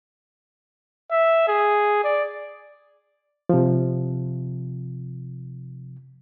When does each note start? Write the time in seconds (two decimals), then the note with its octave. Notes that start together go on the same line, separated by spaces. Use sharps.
1.11 E5
1.48 G#4
2.04 D5
3.49 C3 F3